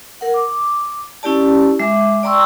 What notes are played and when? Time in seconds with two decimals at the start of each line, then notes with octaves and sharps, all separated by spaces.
0.21 A#4 F#5
0.34 D6
1.23 C#4 E4 G4 D5 A5
1.79 G#3 E5 D6
2.23 D5 G5 A#5 C6 C#6 E6